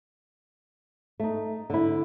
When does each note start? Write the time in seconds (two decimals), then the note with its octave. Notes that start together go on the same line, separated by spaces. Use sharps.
1.20 A3 D#4
1.70 D3 E4